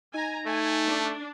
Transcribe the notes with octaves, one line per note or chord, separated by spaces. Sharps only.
D#4 G#5 A#5
A3 G#5
D4